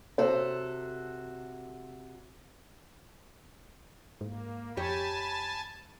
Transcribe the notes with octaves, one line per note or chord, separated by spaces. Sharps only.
C3 F#4 A4 C5 C#5
G#2 A#3
F2 G4 C#5 G#5 A5 B5